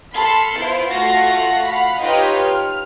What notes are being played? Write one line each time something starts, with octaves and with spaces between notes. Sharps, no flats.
A4 B5 C6 F6
B3 E4 F4 C5
A3 F4 F#4 F5 F#5 A#6
F5 F#5 B5
D#4 F4 G4 B4 C#5 D#5
F6